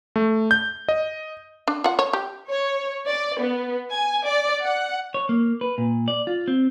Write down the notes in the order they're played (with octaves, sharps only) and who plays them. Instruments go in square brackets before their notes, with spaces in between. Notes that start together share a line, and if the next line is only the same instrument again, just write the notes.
[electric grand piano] A3
G6
D#5
[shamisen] D4
F4 F#5
C#5
G4
[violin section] C#5
D5
B3
G#5
D5
F#5
[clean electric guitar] C#5
A#3
B4
A#2
D5
F4
C4